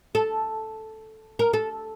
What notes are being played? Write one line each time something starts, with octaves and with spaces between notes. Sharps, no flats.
A4
A#4
A4